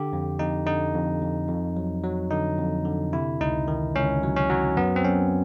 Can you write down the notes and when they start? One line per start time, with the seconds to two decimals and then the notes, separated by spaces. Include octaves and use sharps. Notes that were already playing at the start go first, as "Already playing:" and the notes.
Already playing: D3 G4
0.13 F2
0.39 F2 D#4
0.67 D3 D#4
0.94 F2
1.22 F2
1.49 F2
1.77 F#3
2.04 F#3
2.31 D3 D#4
2.59 F2
2.85 D3
3.13 C3 E4
3.40 C#2 D#4
3.68 D#3
3.95 C#2 C#4
4.23 F#3
4.36 C#4
4.50 F#3
4.77 F#2 B3
4.96 C4
5.04 F#2 C#4